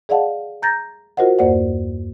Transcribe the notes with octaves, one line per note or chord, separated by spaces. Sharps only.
G#4 D5 D#5 F5 F#5 A5
A#5 G6 A6 A#6
F4 F#4 A#4 C5 D#5 F#5
E2 G2 A#3 C5 D5 F#5